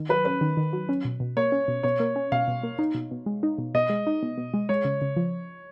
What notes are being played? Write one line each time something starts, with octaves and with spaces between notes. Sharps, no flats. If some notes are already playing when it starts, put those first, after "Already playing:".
Already playing: D#3
F#3 B4
C#4 B4
D#3
D#3
F#3
C#4
B2
B2
A#3 C#5
C#4
B2
B2 C#5
A#3
C#4
B2 F5
B2
A#3
D#4
B2
B2
G#3
D#4
B2
B2 D#5
G#3
D#4
B2
B2
G#3
G#3 C#5
C#3
C#3
F3